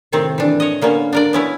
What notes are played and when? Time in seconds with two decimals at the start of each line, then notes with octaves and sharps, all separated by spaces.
0.12 A2 C3 D#3 C4
0.38 E3 D4
0.60 C#5 D#5
0.81 D3 A#3 B3 C#4
1.13 D4 A#4 D5
1.33 B3 C#4 E4